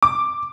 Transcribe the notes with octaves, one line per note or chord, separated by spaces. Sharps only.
D6